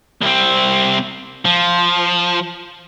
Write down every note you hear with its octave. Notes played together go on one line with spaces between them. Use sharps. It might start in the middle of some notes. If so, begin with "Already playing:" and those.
C2 C4
F3